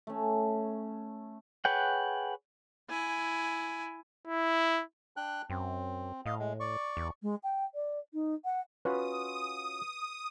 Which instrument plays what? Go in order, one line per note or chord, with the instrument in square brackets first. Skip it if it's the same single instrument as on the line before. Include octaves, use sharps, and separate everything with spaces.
[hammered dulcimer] A3 C#4
[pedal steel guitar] G#4 B4 C#5 F#5 G5
[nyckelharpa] E4 G#5
[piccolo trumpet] E4
[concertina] D4 G5 F#6
[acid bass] F#2 [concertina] C4
[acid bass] A2 [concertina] D#5 F5
[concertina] G#3
D5 C#6
[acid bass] E2
[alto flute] G#3
G5
D5
D#4
F#5
[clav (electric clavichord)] C#4 F4 F#4 [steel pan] B4 [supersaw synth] D#6